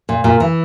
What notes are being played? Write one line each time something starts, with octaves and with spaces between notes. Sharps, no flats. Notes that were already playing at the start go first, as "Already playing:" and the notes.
A#2
A#2
E3